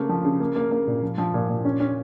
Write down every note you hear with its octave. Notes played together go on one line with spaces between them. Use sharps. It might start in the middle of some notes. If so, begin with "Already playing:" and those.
Already playing: C#3 A3 A#3
F3
C#3
A#3
A#3
A#3
A#2
F3
F3
A#2
A#2
C#4
C#4